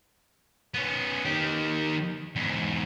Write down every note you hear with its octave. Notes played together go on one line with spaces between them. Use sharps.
B3 C#4
D#3 G4
E2 G#2